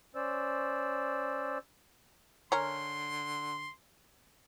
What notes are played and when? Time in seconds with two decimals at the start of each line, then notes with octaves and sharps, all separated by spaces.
0.15 C#4 C5 D5 E6
2.52 D3 C#4 A#4 C6